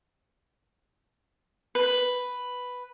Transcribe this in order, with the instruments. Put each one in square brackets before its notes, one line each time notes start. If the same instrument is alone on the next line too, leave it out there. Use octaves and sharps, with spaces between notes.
[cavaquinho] B4